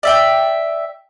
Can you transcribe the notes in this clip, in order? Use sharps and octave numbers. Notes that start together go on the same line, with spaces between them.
D5 E5 G5